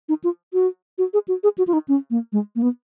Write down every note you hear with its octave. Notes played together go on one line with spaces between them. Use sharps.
D#4
F4
F#4
F#4
G#4
F#4
G#4
F#4
F4
D#4
C#4
A#3
G#3
A#3
B3